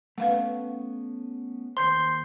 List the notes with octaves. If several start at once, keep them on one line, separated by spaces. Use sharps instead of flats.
A3 B3 C#4 B4 F5 F#5
D#2 C5 C6 G6 C7